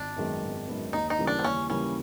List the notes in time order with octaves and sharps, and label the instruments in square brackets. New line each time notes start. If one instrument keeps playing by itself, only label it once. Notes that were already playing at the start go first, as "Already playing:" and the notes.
Already playing: [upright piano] G#1 [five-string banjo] D4
[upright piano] F#2 D#3 G#3 B3
G#1
F#2 D#3 G#3 B3
[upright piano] D#2 [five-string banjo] D#4
[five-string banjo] D#4
[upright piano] C#3 E3 G3 A#3
[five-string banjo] D4
C4
[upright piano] D#2 [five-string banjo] C#4
[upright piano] C#3 E3 G3 A#3 [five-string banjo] C#4